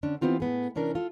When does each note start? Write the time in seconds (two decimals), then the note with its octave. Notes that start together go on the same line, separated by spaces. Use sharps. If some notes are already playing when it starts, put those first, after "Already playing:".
0.03 D3 C#4 D4
0.21 E3 F#3 B3 C4 F4 G4
0.40 A2 B3 G#4
0.75 C3 E3 C#4 D4 A#4
0.95 F4 A4